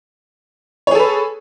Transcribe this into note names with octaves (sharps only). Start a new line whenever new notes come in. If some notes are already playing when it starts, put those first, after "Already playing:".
G#4 A4 B4 C#5